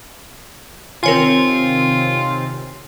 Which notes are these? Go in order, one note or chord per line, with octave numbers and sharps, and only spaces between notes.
C3 D#3 C4 F4 A#4 C#5 G#5